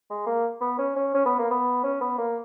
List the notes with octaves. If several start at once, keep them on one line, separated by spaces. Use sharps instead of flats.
G#3
A#3
B3
C#4
C#4
C#4
B3
A#3
B3
C#4
B3
A#3